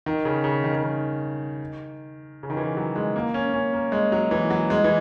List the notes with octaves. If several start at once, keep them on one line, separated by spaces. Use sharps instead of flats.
D#3
C#3
C#3
D#3
C#3
D#3
C#3
D#3
E3
F#3
G#3
A#3
C#4
C#4
A#3
G#3
F#3
E3
F#3
G#3
E3